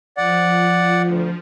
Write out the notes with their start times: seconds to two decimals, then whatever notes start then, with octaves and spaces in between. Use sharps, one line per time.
0.17 F3 D5 F#5
1.04 D2